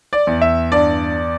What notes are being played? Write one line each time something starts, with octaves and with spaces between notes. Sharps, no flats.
D5
E2
E5
G2 D5